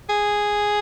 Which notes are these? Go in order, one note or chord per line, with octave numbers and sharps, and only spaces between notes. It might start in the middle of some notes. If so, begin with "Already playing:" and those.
G#4